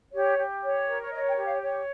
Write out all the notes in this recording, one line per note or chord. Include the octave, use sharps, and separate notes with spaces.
G4 C#5
G4
C#5
A#4
C#5
C#5 D#5
G5
G4
F5
C#5